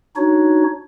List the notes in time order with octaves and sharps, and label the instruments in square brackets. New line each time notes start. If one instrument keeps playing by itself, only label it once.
[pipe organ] D4 D#4 F#4 C#5